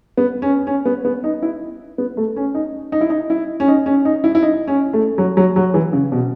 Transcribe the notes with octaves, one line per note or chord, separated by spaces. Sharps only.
B3
C#4
C#4
B3
B3
D#4
E4
B3
A3
C#4
D#4
D#4
E4
D#4
E4
C#4
D#4
C#4
D#4
E4
E4
D#4
C#4
A3
F#3
F#3
F#3
E3
C#3
B2